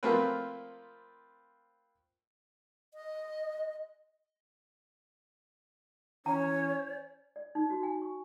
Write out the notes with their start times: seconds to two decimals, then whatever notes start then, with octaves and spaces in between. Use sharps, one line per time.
0.03 F3 A3 A#3 C4 A#4 B4
2.94 D#5
6.26 E3 C#4 C#5 A#5
7.36 D5
7.55 D#4
7.70 F#4
7.83 G#5
8.02 C#6